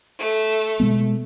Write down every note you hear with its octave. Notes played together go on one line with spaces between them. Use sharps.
A3
B2 G#3 B3